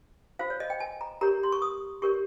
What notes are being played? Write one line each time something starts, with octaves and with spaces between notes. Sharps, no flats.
F4 C5 F5
C#5
D#5
G5
G#5
A#5
G4 A#4 C#5 A#5
C6
C#6
D#6
G4 A#4 C#5 C#6